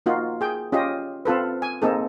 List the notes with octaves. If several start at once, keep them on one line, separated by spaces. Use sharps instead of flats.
A#3 D#4 F4 F#4
G#4 G5
C#4 F4 G4 D#5
C4 F4 A4 B4
G#5
A#3 C4 D#4 G#4 A4